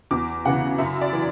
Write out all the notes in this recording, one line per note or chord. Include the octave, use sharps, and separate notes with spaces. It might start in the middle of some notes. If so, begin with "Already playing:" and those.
E2 D6
C#3 E3 F#5
F#2 E5
D5
E3